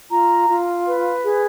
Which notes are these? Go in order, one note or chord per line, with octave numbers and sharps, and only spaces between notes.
F4 A#5
F4
B4
G#4